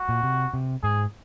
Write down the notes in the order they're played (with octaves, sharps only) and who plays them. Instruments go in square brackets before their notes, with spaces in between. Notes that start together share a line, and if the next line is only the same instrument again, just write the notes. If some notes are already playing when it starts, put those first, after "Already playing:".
Already playing: [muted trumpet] F#4
[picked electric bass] A#2
C3
C3
[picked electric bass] G#2 [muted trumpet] G#4